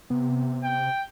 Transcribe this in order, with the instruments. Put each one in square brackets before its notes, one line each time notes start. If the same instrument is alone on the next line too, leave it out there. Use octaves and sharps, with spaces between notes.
[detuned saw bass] C3 [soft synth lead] B3
[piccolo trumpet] G5